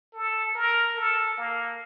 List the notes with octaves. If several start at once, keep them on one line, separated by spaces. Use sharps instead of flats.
A4
A#4
A4
A#3